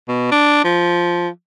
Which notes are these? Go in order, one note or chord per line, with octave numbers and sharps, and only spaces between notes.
B2
D4
F3